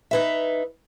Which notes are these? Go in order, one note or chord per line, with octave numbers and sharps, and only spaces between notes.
D#4 B4 E5